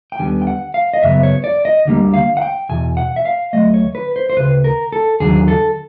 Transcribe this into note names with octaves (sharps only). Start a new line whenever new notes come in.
G5
D#2 D3 G3 B3 G#5
G5
F#5
F5
D#5
F#2 C#3 F#3 B3 E5
C#5
D5
D#5
D2 D3 G3 A#3
F5
F#5
G5
E2 B2 G#5
F#5
E5
F5
D2 C#3 F#3 A3 D#5
C#5
B4
C5
C5
D2 C#3 B4
A#4
A4
D#2 D3 F#3 G#4
A4